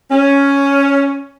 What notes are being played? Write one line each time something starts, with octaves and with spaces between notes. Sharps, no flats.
C#4